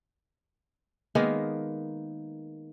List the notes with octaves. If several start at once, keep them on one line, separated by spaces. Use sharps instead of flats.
D#3 G#3 A#3 B3